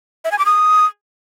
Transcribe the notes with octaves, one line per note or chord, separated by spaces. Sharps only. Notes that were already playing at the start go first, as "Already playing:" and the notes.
E5
G#5
D6
D#6